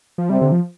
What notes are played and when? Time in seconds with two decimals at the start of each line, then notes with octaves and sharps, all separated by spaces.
0.18 F3
0.29 C3 G3
0.41 D3
0.52 F3